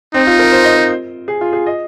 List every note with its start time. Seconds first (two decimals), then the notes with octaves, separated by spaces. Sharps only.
0.14 C4 D#4
0.27 F4
0.39 A#4
0.52 C5
0.64 D#5
0.77 C5
1.28 G#4
1.41 F4
1.53 G#4
1.66 D#5